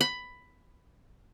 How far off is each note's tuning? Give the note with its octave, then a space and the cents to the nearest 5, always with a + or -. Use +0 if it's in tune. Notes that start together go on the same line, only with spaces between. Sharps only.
B5 +10